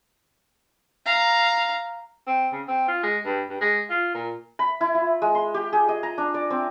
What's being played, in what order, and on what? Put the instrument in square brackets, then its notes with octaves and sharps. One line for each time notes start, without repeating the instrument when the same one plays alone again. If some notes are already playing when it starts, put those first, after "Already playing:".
[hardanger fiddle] F5 A#5
[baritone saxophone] C4
C#3
C4
F4
G#3
G2
G2
G#3
F4
A#2
[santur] B5
E4
F4
G#3
C6
G4
G#4
D#5
A#5
D4
D5
C4